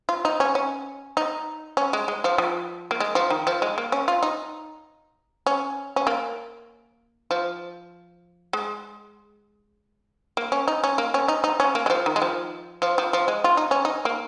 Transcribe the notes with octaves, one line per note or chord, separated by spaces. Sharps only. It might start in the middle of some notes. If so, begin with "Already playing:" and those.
F4
D#4
C#4
C#4
D#4
C#4
G#3
G#3
F3
F3
A#3
G#3
F3
D#3
F3
G#3
A#3
C#4
F4
D#4
C#4
C#4
A#3
F3
G#3
A#3
C#4
D#4
C#4
A#3
C#4
D#4
D#4
C#4
A#3
G#3
F3
D#3
G#3
F3
F3
F3
F3
G#3
F4
D#4
C#4
D#4
A#3